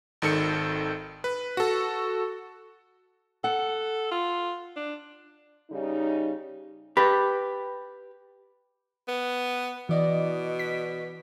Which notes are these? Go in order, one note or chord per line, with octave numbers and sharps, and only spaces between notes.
G#1 D#3 A4 C#7
B4
F#4 A4
A4 F#5
F4
D4
C#3 G3 D#4
G4 B4
B3
B2 E3 D5 D#5
B6